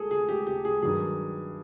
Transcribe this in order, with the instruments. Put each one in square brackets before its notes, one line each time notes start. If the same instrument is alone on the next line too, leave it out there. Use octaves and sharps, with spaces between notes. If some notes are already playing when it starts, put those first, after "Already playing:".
Already playing: [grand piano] G#4 A4
G#4
G4
G4
G#4
G2 D#3 F#3 G#4